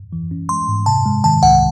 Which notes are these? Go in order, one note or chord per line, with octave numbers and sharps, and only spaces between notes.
E3
C#4
G#3 C6
G#2
C3 A5
G#3
D#3 A5
C2 F#5